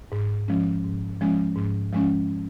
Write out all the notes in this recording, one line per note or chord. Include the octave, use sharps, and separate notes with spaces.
G#2
F3 G#3 C#4
G#2
F3 G#3 C#4
G#2
F3 G#3 C#4